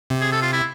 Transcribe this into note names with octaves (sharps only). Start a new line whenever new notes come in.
C3
G#4
A4
F4
E4